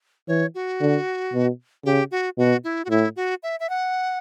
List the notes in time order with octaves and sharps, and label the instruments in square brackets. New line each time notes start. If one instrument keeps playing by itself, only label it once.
[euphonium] E3 [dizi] C#5
[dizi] F#4
[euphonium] D3
B2
[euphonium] C#3 [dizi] G4
[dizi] F#4
[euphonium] B2 [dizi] F#4
[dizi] E4
F#4
[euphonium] A2 [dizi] E4
[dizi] F#4
E5
E5
F#5